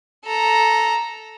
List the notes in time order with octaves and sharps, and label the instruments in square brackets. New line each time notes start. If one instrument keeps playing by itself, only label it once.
[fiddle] A4 A#5